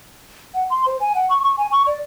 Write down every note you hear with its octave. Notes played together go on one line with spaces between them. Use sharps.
F#5
C6
C5
G#5
F#5
C#6
C#6
G#5
C#6
D5